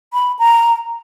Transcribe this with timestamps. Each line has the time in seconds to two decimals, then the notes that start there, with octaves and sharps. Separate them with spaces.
0.14 B5
0.39 A#5